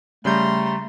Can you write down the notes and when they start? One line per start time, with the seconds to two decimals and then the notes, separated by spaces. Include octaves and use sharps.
0.25 C#3 G3 A3 A#5 C6 G6